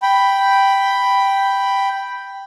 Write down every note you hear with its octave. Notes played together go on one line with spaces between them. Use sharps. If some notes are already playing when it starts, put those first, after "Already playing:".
G5 B5